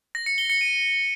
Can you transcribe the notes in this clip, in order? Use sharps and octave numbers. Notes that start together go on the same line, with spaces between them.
A#6
C#7
G7
C#7
D#7